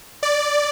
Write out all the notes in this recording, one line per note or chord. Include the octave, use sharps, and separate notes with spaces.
D5